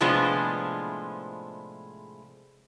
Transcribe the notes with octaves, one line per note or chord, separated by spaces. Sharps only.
A2 C3 F3 G#3 B3 D4